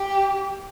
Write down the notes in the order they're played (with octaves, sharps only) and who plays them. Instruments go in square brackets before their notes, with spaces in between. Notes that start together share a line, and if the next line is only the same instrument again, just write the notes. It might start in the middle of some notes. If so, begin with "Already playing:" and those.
Already playing: [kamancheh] G4